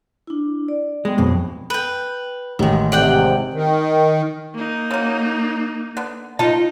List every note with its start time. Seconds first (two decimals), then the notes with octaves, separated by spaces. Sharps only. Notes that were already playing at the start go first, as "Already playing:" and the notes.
0.27 D4 E4
0.68 D5
1.05 G#3 B3 G5
1.18 B1 F2 B2
1.70 B4 G5
2.59 A1 D#3 G#3
2.92 G#2 C3 D5 F#5 G5
3.54 D#3
4.54 A#3 D#4
4.91 C#3 F#3
5.97 D3 B3
6.39 D#4 F4 D#5 A5